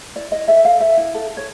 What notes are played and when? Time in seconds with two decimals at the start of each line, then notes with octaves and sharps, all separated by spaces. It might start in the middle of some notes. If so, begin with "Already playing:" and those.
0.16 E4 D5
0.31 E4 D#5
0.48 A4 E5
0.65 A4 F5
0.81 A4 E5
0.97 E4
1.14 A4
1.30 A4
1.37 C#5